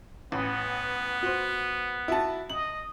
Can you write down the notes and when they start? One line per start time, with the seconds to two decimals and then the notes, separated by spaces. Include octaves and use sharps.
0.32 A1 B3
1.23 F#4 C5
2.08 E4 F#4 A5
2.50 D#5 F#7